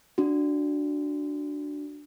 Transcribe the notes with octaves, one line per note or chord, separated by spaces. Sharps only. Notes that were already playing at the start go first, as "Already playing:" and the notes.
D4 F#4